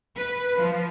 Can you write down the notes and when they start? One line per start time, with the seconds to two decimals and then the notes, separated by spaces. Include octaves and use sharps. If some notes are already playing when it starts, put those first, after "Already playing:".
0.17 B4
0.59 F3